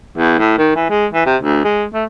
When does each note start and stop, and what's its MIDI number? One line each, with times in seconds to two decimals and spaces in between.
0.18 0.36 40
0.39 0.57 45
0.58 0.73 51
0.75 0.90 52
0.90 1.06 56
1.14 1.26 52
1.26 1.37 48
1.42 1.63 38
1.65 1.86 56
1.93 2.04 57